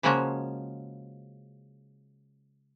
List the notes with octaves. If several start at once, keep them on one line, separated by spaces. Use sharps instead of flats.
C#3 F3 G#3 A#3 C#4 F#4